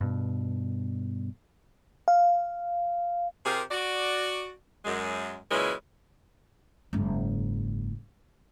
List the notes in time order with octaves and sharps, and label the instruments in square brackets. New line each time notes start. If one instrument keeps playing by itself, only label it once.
[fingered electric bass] G2 B2
[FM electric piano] F5
[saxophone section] C3 F4 G4 G#4 A#4
F#4 D5
F#2 G#3
A#2 C#3 F#3 G#3 E4 B4
[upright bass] F#1 G#2